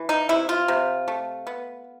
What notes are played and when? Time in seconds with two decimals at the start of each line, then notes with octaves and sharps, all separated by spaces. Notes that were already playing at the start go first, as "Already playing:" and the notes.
Already playing: E3
0.09 D#4
0.29 C3 E4
0.49 F4
0.68 C3
1.08 A3
1.47 B3